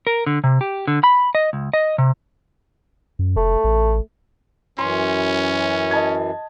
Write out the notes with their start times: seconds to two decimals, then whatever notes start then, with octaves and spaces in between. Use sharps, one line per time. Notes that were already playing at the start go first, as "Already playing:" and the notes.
0.07 A#4
0.27 D3
0.44 C3
0.61 G4
0.88 D3
1.04 B5
1.35 D#5
1.53 C#2
1.74 D#5
1.98 C3
3.19 F#2
3.37 F1 A3
3.64 A1
4.79 F#2 E3 C#4 C6
5.91 D#5 A5 G#6